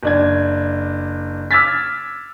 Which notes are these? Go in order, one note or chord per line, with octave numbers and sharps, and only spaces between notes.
F#1 D4 G#6
D6 E6 F6 G#6 A6 B6